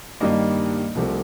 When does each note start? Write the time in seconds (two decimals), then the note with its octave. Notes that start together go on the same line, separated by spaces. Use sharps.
0.20 G2 D#3 G3 A#3 D#5
0.95 C2 C3 F3 A3